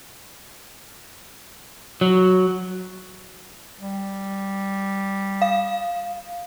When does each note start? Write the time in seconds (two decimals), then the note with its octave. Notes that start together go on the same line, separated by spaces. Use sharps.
2.01 F#3
3.81 G3
5.42 F5